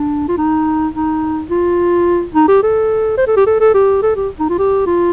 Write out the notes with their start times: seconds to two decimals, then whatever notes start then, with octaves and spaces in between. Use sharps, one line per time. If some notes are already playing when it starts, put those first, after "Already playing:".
Already playing: D4
0.28 F4
0.38 D#4
0.94 D#4
1.50 F4
2.35 D#4
2.48 G4
2.63 A4
3.18 C5
3.27 A4
3.37 G4
3.46 A4
3.60 A4
3.74 G4
4.02 A4
4.16 G4
4.39 D#4
4.49 F4
4.59 G4
4.86 F4